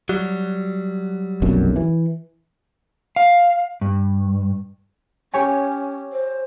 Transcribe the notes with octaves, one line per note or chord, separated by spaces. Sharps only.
F#3 G3
F1 B1 F#2
E3
F5
G2
C#4 G4 C#5 G#5
C5